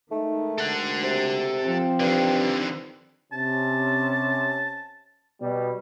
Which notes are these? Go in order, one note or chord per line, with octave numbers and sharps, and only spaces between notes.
D#3 G#3 A3 D#4
D2 A4 F#5
C3
F3 C4
G2 D3 D#3
C3 C#4 A5
B2 G3